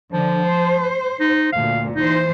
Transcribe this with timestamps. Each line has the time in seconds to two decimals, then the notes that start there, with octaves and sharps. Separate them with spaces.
0.12 D3 F3
0.45 C5
1.20 D#4
1.53 D2 A#2 F5
1.96 E3 D#4 C5